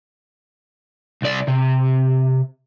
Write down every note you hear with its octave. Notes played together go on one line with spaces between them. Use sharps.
C2 D5
C3